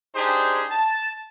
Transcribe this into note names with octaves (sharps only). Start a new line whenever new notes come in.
D4 D#4 G4 G#4 C5
A5